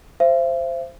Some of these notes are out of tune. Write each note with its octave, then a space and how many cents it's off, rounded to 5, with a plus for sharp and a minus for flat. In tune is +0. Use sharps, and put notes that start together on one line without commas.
C5 +0 E5 +45